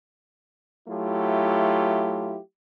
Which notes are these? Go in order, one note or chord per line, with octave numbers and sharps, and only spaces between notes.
F#3 A3 E4 F4 G4